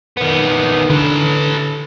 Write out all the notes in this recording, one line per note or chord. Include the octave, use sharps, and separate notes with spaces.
D#3 B3
D3 A4 B4